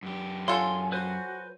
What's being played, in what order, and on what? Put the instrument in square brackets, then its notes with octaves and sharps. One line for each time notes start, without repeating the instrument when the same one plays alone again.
[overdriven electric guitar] F#2 G4
[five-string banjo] F#3 F4 A4 [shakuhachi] G#5 [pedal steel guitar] C6
[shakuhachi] F#4 [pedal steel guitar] B4 C5 G#5